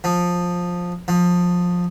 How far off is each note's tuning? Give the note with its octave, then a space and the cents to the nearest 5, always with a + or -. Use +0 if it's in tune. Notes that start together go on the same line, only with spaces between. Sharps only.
F3 +15
F3 +20